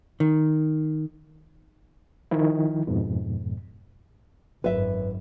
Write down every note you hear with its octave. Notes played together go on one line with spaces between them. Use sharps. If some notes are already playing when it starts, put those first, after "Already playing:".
D#3
D#3 F3 E4
F2 G#2 B2
G#1 F#2 B4 E5